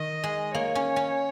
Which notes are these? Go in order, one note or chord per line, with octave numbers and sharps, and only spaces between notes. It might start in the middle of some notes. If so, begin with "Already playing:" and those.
Already playing: D#3 D#5
G#3
A#3 C#5
C#4
C#4